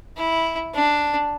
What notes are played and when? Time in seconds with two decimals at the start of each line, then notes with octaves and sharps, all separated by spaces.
0.17 E4
0.75 D4